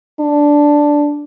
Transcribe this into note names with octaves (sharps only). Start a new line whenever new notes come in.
D4